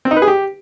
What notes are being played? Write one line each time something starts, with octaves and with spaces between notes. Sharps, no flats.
C4
D#4
B4
G#4
G4